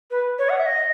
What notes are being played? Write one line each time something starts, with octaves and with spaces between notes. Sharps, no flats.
B4
C#5
F#5
E5
D#5